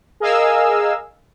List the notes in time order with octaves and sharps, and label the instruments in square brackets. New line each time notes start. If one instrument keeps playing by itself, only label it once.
[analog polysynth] G#4 A#4 D#5 F5 G#5 E6